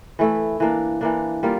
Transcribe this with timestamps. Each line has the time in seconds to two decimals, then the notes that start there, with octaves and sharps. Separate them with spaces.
0.19 E3 A3 E4
0.60 E3 A#3 D4
1.01 E3 A#3 D4
1.43 G3 A#3 F4